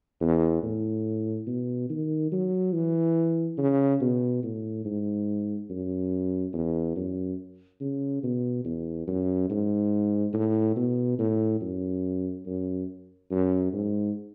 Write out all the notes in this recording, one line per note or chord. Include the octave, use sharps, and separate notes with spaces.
E2
A2
B2
D#3
F#3
E3
C#3
B2
A2
G#2
F#2
E2
F#2
C#3
B2
E2
F#2
G#2
A2
B2
A2
F#2
F#2
F#2
G#2